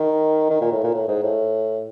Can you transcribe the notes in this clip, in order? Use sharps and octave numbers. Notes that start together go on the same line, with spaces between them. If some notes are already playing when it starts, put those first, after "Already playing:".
Already playing: D#3
D#3
A#2
A2
A#2
A2
G#2
A2